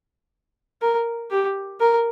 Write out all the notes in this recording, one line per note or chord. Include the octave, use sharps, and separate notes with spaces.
A#4
G4
A#4